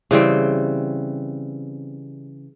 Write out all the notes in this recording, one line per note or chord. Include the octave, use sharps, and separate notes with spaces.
C#3 E3 G3 C4